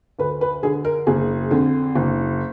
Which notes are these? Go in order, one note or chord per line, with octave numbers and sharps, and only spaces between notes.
D2 B4
B4
D3 G#4
A#4
F#1 G#4
F2 D3
F#1